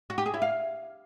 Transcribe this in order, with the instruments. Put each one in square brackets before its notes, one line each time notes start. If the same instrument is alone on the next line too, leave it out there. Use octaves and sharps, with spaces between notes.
[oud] F#4
G4
G#4
E4
F5